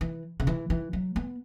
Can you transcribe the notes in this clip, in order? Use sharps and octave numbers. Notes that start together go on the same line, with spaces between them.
E3
C#3
E3
E3
F#3
B3